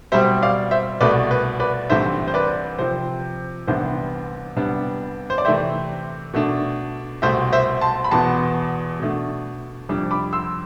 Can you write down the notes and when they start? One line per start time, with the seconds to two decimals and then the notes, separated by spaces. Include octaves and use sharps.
0.12 B2 G3 C4 C5 E5
0.43 D5 F5
0.71 C5 E5
1.01 C2 B2 A3 B4 D5
1.31 B4
1.60 B4 D5
1.90 C2 C3 E3 A3 D4 C5 E5
2.27 C5
2.34 B4 D5
2.78 C3 F3 C4 C5
3.67 C2 C3 E3 B3 D4 C5
4.56 C2 C3 G3 B3 D4
5.30 C5
5.38 D5
5.45 C3 E3 A3 C4 C5 E5
6.34 B2 A3 D4
7.22 C2 B2 A3 C4 C5 E5
7.52 C5 E5
7.81 A5 C6
8.04 B5
8.11 E2 B2 B3 A5 C6
9.00 B2 A3 D4
9.89 F2 C3 G3 D4
10.11 B5 D6
10.33 C6 E6